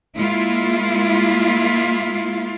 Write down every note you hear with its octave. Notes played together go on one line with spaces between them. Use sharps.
G#3 A#3 E4 F4